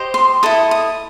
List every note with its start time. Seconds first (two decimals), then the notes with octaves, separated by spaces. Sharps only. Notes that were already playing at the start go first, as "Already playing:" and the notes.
Already playing: G4 C5 D#5
0.14 C6
0.43 E4 A4 D#5 D#6
0.71 D#6